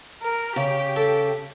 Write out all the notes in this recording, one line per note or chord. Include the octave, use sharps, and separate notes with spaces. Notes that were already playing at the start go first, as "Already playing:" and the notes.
A#4
C#3 G4
A4